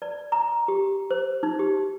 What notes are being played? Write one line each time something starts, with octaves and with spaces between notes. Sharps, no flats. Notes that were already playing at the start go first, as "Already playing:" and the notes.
D5
A#5
G4
C5
D#4
G4